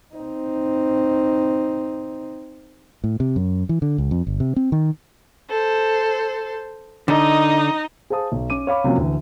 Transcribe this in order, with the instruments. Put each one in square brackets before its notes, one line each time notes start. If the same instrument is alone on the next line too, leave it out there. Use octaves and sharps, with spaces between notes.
[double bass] C4 D#4
[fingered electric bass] A2
C3
F#2
E3
D3
C#2
F2
G1
C3
C4
D#3
[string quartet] A4 C5
[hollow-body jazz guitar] D3 [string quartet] D#4 D#5
[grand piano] G#4 C5 F5 A5 D#6
B1
C#4 D6 D#7
C#5 F5 B5 D6
C3 F3 F#3 A#3 C#4
D2 E3